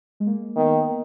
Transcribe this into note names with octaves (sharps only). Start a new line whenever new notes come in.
G#3
A#3
D#3 B3